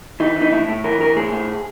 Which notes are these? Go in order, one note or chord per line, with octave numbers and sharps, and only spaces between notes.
E3 D#4
E3
D#4
A2 E4
A2
E3 A#4
E3 A#4
A2 G#4
A2